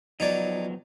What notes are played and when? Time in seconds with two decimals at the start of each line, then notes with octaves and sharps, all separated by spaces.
0.20 F3 F#3 B3 D#4 C#5 D5